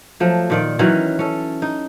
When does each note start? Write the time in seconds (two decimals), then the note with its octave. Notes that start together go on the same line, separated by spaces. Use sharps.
0.20 F3 F#3 A3
0.50 A#2 D#3 D5
0.79 D#3 E3 F#3 C#4
1.19 C#4 A4
1.62 D#4